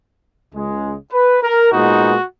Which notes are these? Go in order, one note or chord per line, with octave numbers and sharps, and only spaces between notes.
C#2 C#3 G#3
B4
A#4
A#2 G#3 B3 D#4 F#4